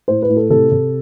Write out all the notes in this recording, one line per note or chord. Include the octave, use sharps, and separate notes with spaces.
A2 C5
B4
A2
A4
C3 A4
C3